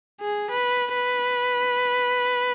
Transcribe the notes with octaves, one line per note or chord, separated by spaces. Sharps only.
G#4
B4
B4